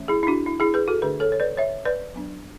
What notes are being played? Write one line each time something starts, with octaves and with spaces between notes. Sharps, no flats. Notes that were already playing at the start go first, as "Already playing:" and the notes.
Already playing: E3 A3 C#4
E4 G#4
E4
D4 F#4
E4
E4 G#4
G#4 B4
F#4 A4
D3 A3 D4 G#4 B4
A4 C#5
C#5
B4 D5
C#5 E5
B4 D5
F#3 B3 D4